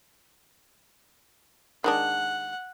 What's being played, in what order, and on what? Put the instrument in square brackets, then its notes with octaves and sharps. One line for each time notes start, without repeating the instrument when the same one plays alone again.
[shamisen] D#3 G#3 D4 [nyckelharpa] F#5